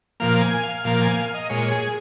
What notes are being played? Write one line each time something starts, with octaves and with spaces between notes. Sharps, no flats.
A#2 F3 A#3 F5
G#5
F5
A#2 F3 A#3 F5
G#5
F5
D#5
A#2 G#3 C#5
G#4